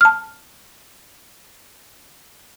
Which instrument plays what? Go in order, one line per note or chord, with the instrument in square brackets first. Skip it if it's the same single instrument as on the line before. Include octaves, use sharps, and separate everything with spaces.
[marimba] A5 F6